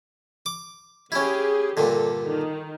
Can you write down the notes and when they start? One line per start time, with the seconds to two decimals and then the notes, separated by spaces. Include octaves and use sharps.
0.46 D6
1.12 C#4 E4 G4 G#4
1.77 G2 A#2 D3 A4
2.27 D#3